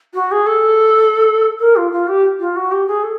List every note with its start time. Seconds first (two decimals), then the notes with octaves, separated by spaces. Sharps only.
0.14 F#4
0.31 G#4
0.46 A4
1.59 A#4
1.76 F4
1.91 F4
2.07 G4
2.39 F4
2.56 F#4
2.71 G4
2.87 G#4
3.03 A4